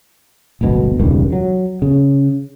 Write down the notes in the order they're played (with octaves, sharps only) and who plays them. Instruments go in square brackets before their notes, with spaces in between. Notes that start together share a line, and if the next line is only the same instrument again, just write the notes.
[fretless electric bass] D1 G1 D2 B2
E1 C#2 G2 D#3
F#3
C#3